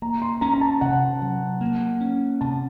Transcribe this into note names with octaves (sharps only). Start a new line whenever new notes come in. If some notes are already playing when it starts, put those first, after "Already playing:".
A#3 A#5
C6
C#4 A#5
A#5
A5
C3 F#5
F#3
A#3
C#4
C3 A5